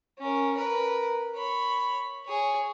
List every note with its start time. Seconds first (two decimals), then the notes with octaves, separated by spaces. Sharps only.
0.19 C#4 A#4
0.56 A#4 B4
1.35 C#5 B5
2.26 G#4 C#5